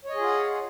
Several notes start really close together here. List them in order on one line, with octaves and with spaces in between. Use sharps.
C#5 D#5 G#4 F4 F#5